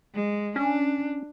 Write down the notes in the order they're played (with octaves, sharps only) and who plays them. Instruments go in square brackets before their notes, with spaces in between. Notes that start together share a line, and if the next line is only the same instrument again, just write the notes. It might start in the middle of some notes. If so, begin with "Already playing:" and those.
[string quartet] G#3
[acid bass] C#4 [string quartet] D4